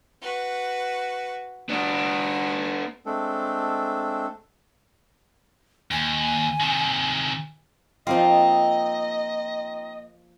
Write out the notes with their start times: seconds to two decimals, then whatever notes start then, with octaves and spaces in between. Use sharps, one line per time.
0.21 F#4 B4
1.69 B3 D4 F#4
3.06 G#3 A3 C4 D4 A4
5.91 D#2 G#5
6.60 C3 D#3
8.07 F3 A#3 C4 D#4 F4 D#5